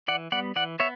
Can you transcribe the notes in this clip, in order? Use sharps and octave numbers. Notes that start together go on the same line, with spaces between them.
E3 D5 F#5
G3 B3 D5 F#5
E3 D5 F#5
B3 C#5 E5